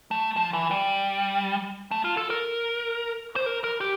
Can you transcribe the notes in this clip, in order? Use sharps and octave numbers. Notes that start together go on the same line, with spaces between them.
A3
F3
E3
G3
A3
F4
A4
A#4
C5
A#4
A#4
G4